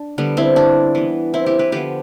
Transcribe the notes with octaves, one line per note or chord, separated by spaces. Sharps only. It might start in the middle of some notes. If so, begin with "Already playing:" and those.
Already playing: D4
D3 G3 B3
C4 E4
D4
E3 B3
C4 E4
E4 G4
G4 B4
D3 F3 B3 G4 B4